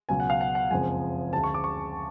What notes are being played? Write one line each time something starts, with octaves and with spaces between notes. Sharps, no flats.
C#2 B2 F#3 G#5
F#5
F5
F#5
F#5
F#1 F2 F3 G#3 G#5
D2 C#3 G#3 A5
C#6
D6
C#6